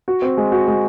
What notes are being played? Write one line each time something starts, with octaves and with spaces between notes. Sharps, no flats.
F#4
C4
G#3
F#4
G#3